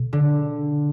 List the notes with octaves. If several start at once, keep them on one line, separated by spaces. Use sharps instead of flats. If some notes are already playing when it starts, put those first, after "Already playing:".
Already playing: B2
D3